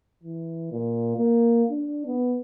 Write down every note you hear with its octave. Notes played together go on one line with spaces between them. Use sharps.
E3
A#2
A#3
D4
B3